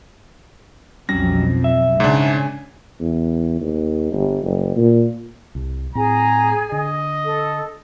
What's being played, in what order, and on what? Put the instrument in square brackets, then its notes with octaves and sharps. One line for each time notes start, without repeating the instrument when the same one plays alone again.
[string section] B1 F2 [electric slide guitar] F#3 G3 C#4 [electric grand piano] A#6
[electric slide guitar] E5
[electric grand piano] G#2 D4 [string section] C#3 G#5
[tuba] E2
D#2
G1
F#1
A#2
[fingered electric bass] C2
[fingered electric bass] A2 C4 [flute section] G#4 G#5 [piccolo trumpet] A#5
[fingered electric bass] D3 [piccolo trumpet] D#5
[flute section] A4